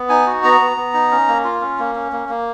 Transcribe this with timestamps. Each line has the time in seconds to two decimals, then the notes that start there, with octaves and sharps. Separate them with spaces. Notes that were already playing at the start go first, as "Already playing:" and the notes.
Already playing: B3
0.09 D#4 G#5
0.27 F#4
0.44 B3 A#5
0.60 B3
0.77 B3
0.94 D#4
1.11 C#4
1.28 A#3
1.44 F4
1.61 C#4
1.79 A#3
1.95 C#4
2.12 A#3
2.29 A#3